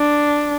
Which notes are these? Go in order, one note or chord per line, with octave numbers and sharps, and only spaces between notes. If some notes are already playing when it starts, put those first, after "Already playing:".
Already playing: D4